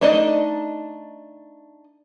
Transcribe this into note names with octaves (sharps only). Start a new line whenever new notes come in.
A3 D4 D#4 D5 D#5